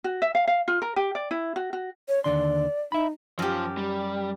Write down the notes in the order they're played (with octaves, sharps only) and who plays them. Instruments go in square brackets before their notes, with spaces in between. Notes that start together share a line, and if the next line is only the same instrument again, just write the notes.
[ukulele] F#4
E5
F5
F5
F4
A#4
G4
D5
E4
F#4
F#4
[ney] C#5
[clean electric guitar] D#2 D3 C6 [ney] D5
[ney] D#4 [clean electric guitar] E5 B5
[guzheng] F#2 G4 [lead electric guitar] F3 F4
[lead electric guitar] G3